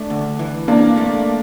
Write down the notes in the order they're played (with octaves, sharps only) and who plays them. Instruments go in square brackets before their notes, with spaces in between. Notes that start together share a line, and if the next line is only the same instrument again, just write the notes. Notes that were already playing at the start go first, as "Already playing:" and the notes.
Already playing: [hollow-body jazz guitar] A3 [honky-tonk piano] D4
[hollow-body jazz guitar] D2
E3
[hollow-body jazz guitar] C3 [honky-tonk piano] A#3 D4
[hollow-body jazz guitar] A3